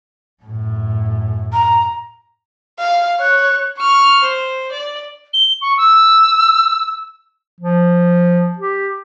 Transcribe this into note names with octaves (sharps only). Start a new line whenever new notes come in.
F#2 A2
A#5
F5
C#5 F#6
C#6 F6
C5
D5
G7
C#6
E6
F3
G4